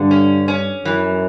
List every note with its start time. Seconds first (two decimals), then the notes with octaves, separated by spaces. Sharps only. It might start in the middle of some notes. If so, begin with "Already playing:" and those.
Already playing: G2 D3
0.11 C#4
0.48 C#4
0.85 F#2 E3